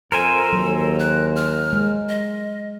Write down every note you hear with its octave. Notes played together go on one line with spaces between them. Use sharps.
F2 A4 A#4 C5 G#5
D#2 F#3
F#6
F6
G#3
D#5